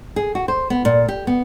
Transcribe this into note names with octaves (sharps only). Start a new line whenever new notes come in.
G#4
F#4
C5
B3
A#2
G4
B3